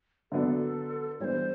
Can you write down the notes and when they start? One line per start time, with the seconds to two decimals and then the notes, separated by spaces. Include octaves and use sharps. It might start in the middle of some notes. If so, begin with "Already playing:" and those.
0.32 D3 F#3 B3 D4 A4
1.20 E3 G3 B3 D4 C5 C#5